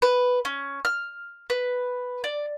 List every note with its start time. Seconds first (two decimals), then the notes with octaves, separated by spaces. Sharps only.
0.02 B4
0.45 C#4
0.85 F6
1.50 B4
2.24 D5